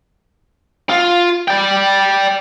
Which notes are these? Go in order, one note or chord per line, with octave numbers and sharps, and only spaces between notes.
F4
D5 G5